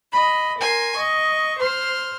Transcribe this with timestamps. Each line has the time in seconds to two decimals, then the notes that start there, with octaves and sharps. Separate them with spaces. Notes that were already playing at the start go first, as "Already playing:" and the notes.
0.10 D#5 B5
0.59 A#4 G#5 C6
0.95 D#5 C#6
1.59 C5 C6 F6